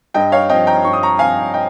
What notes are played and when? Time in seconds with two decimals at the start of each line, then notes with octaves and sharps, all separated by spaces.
0.14 G2 D#5 G5
0.32 C#5 F5
0.49 F3 C4 D#5 G5
0.67 G5 A#5
0.84 G2 C#6
0.93 D#6
1.03 A#5 C#6
1.19 F3 C4 F5 G#5
1.54 D#5 G5